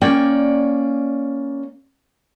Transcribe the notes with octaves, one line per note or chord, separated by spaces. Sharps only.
A#3 C#4 D5 G5